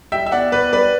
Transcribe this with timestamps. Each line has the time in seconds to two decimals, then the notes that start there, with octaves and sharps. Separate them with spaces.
0.12 G3 E5 G5
0.26 E5
0.32 B2 D5 F#5
0.52 B2 B4 D5
0.72 G3 B4 D5